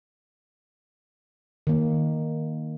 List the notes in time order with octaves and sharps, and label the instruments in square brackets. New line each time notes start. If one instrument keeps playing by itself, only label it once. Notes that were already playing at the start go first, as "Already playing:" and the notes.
[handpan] D#3 A#3